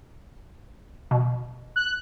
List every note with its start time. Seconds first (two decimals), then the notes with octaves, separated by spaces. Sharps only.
1.11 B2
1.76 F#6